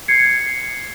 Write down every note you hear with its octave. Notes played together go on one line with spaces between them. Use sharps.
G#6 C7 C#7